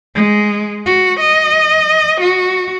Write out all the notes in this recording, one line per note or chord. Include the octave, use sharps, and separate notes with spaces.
G#3
F#4
D#5
F#4